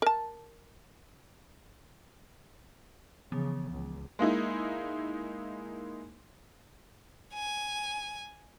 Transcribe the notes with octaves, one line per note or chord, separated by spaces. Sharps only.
A#4 A5
C#3 E3 F3 B3
C#2
G#3 A#3 D#4 E4
G#5